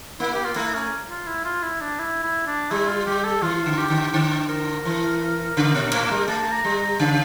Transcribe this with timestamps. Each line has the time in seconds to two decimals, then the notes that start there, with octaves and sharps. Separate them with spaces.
0.20 A#3 E4
0.34 G4
0.45 F4
0.56 A3 E4
0.74 C#4
1.10 F4
1.27 E4
1.45 F4
1.63 E4
1.81 D4
1.99 E4
2.23 E4
2.47 D4
2.70 G3 E4
2.88 F4
3.06 G3 G4
3.24 A4
3.42 E3 F4
3.66 D3
3.78 G4
3.90 D3
4.13 D3
4.49 A#4
4.85 E3
5.57 C#3
5.74 A#2
5.93 A2
6.11 G3
6.28 A3 A5
6.52 A#5
6.65 G3
6.76 A#5
6.99 C#3 A5